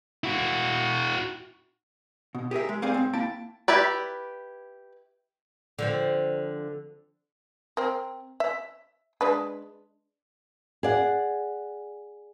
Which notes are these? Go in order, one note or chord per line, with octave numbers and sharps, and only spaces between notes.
E4 F#4
B2
G4 G#4 A#4 E5
G#3
C4 G#4 C5 D5 F5 G#5
G#2 C4
A#3 E4 G5 A5
E4 G4 B4 D5
D3 F3 C4
C4 A#4
E5
G#3 D4 B4
G#4 D5 F#5